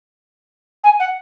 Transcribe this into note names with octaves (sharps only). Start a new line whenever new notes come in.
G#5
F#5